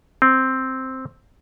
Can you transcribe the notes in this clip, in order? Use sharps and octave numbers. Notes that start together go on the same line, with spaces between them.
C4